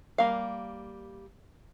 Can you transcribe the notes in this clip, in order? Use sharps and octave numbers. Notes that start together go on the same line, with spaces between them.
G3 A#3 F5